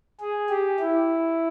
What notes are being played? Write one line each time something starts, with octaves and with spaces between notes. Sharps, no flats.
G#4
G4
E4